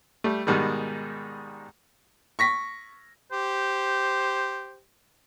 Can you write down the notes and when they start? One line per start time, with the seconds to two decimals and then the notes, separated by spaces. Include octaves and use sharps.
0.24 G3 A3
0.47 G#2 B2 D#3 G3 G#3
2.39 C#6 A#6 B6
3.32 G4 C5